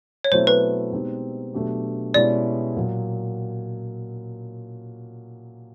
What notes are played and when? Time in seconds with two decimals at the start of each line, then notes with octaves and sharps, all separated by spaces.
0.24 C#5
0.31 B2 F#3 A3 C4 E4 C5
0.47 B4
0.93 B2 G#3 C4 D#4 G4
1.54 B2 F#3 A3 D4 G4
2.14 B2 G#3 C#4 E4 G4 D5
2.77 A#2 F#3